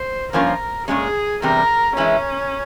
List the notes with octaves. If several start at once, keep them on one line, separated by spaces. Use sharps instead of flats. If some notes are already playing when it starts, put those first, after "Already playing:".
Already playing: C5
G2 F3 A#3 C#4 F4 A#4
A#2 G#3 C#4 G#4
E2 C3 G3 A#4
E3 G#3 C#4 E4